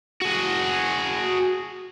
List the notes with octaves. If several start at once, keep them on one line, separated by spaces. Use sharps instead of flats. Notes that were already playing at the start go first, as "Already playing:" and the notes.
F#4 G#4